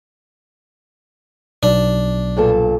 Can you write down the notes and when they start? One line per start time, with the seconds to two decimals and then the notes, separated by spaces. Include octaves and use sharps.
1.63 B1 D4
2.37 G2 A#2 A4